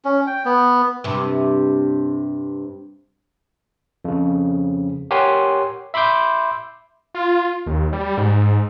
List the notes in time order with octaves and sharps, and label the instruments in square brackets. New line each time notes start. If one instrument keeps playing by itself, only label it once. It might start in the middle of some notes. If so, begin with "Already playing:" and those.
[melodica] C#4
G5
B3
[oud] G2 C3
[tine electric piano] F2 C#3
G4 A#4 C#5 F#5 G#5 C6
E5 B5 C6 D6 G6
[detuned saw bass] F4
D#2
G3
G#2